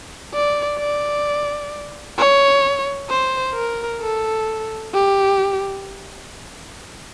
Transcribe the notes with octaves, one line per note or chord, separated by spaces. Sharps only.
D5
D5
C#5
C5
A#4
A4
G4